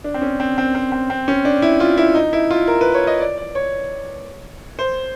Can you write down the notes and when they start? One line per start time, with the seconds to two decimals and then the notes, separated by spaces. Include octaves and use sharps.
0.04 D4
0.14 C4
0.22 C#4
0.40 C4
0.58 C4
0.75 C4
0.92 C4
1.10 C4
1.28 C#4
1.45 D4
1.62 E4
1.80 F4
1.98 E4
2.15 D#4
2.33 E4
2.51 F4
2.68 A#4
2.81 B4
2.94 C#5
3.07 D#5
3.20 D5
3.38 D5
3.55 C#5
4.79 C5